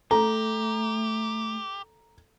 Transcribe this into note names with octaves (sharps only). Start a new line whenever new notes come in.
A3 G4 A4 A#5